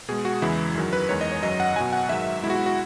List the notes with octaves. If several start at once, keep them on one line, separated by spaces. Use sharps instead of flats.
B2 G#3 G#4
F#4
E2 C#3 E3 G#3 E4
F#2 D#3 F#3
B4
E2 D#3 G#3 C#5
D#5
C#5
F#2 D#3 F#3 D#5
F#5
B2 F#3 G#5
F#5
G#2 D#3 F#3 E5
B2 G#3 E4 F#4
E4
F#4